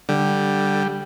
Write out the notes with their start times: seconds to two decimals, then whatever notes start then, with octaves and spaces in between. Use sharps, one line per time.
0.09 D3 G3